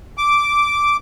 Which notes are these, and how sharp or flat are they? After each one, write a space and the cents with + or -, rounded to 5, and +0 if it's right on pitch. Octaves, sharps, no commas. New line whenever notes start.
D6 -5